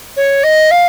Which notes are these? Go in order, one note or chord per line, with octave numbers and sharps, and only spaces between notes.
C#5
D#5
F5